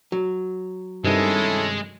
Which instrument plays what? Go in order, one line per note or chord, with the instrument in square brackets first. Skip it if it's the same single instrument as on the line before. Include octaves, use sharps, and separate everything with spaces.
[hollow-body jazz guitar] F#3
[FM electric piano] G2 C3 D#3 [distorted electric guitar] G#3 [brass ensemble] C#4 E4 A4